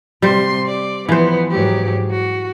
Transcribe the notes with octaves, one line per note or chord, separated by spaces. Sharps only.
C3 G3 C5 C6
D5
E3 F3 B3 C5
G#2 F#3 G4
F#4